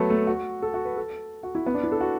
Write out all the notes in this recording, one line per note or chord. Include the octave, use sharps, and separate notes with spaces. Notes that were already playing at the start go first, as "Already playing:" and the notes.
Already playing: F#3 A3 B3 A4
A3
F#4
A4
F#4
B4
A4
F#4
E4
B3
D4
E4
A4
F#4